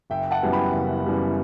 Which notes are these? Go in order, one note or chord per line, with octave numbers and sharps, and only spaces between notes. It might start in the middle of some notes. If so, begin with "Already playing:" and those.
F#1 E5 G5
F#5 A5
F#2 E3 G3 B3
G5 B5
F#1
F#2 E3 G3 B3